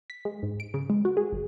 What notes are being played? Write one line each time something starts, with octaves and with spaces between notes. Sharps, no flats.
B6
G#3
G#2
D7
C#3
G#3
F#4
G#4
G1